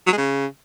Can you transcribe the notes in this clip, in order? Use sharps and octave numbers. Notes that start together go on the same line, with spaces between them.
F#3
G#3
C#3